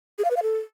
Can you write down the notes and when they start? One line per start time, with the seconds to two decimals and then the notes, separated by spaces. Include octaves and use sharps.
0.18 G#4
0.24 F5
0.30 B4
0.36 F5
0.42 A4